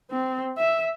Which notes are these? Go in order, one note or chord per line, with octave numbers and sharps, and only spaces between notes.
C4
E5